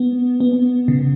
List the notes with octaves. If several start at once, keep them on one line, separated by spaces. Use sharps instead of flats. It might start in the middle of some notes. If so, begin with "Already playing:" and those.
Already playing: B3
B3
C#3